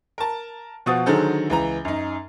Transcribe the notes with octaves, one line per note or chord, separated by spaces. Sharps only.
A#4 A5
B2 F3 F#4 F#5 D#6 A6
D3 D#3 F#3 G#4 A4 C5
C#2 E3 A#5
F#2 D#4